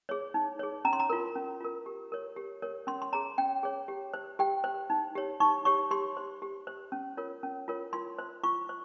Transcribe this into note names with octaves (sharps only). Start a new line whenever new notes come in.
G#4 C#5
D#4
G#4 C#5
C#4 A#5
C6
A#5
F4 A#4
C#4
F4 A#4
G4
A#4 C#5
G4
A#4 C#5
C#4 C6
C6
G#4 C#5 A#5
C#4 G5
G#4 C#5
G4
C5
G4 G5
C5
D#4
G4 C#5
D#4 C#6
G4 C#5 C#6
G4 C6
C5
G4
C5
C#4
F4 A#4 C#5
C#4
F4 A#4 C#5
F4 C6
C5
F4 C#6
C5